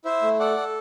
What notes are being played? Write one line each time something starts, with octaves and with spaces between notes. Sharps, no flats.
E4 C5 E5
A3
A4 D5 F#5
A4